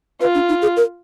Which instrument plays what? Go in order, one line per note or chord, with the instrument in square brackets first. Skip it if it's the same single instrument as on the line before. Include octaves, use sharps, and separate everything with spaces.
[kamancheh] F4 [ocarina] B4
[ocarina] D4
D#4
G#4
A#4